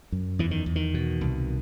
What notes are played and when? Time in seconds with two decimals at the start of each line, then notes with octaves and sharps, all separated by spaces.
0.12 F#2
0.39 E2 E3
0.51 D#3
0.66 E2
0.76 D#3
0.94 B2
1.21 C2